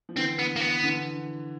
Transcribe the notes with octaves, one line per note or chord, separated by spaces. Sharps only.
F3
D3 E3 C4
B3
A#3
B3
D3 E3